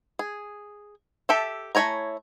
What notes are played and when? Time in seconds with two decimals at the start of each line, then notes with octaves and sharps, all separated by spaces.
0.19 G#4
1.29 G4 A4 E5 A5
1.75 A3 E4 C#5 G#5 A#5